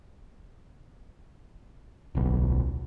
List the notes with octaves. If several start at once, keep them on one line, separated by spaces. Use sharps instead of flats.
D1 B1